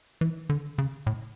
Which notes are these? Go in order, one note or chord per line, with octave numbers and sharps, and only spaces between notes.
E3
D3
C#3
A2